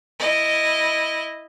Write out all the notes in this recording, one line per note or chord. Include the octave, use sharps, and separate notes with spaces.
E4 D#5